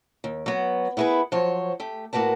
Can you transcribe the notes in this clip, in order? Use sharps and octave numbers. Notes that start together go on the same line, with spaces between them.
D#2
F#3 B3
B3 E4 G#4 A4 B4
F3 F#3 C5 C#5
A3 G4
A2 A#3 F#4 B4 A5